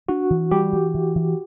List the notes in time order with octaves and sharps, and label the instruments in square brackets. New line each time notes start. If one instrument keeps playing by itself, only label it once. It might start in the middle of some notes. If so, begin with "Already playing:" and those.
[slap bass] D4 [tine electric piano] F#4
[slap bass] E3
[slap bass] G3 [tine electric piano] G4
[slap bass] E3
E3
E3